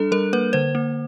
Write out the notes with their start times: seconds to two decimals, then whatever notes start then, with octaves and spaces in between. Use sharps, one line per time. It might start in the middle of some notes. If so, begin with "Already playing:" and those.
Already playing: G3 D4 A4
0.12 G3 A#4
0.33 A#3 B4
0.53 D3 C5
0.75 A#3